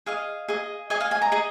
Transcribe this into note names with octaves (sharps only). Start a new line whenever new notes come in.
G#4 D#5 F5
G#4 D#5
G#4 D#5 G#5
F5
G#5
A#5
G#4 D#5